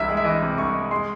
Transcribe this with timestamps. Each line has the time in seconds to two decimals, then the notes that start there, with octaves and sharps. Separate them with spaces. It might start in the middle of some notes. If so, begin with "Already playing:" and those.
Already playing: C2 C3 E3 E5
0.09 G#3
0.17 E5
0.24 E3 D#5
0.42 C3
0.58 C2 C#6
0.74 G#3
0.91 G#3 C6